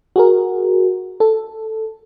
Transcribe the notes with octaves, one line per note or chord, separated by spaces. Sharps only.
F#4 G#4 A#4
A4